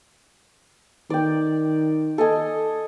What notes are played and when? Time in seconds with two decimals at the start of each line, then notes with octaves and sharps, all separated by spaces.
1.10 D#3 D5 G5
2.18 A4 D#5 G#5